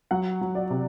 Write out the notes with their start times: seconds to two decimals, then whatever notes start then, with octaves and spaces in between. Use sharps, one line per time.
0.11 F#3 F#5
0.41 F#3
0.55 D5
0.70 C3